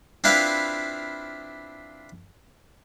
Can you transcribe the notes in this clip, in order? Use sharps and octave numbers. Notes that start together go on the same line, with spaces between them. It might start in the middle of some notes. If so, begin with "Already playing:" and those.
C4 D4 E4 F4 B4 F5